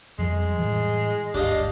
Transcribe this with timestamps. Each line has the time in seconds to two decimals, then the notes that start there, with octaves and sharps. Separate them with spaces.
0.18 F2 F3 G3 G#3
0.58 A2 E3 G3
1.34 G1 D2 G#2 D4 G4 D#5 F5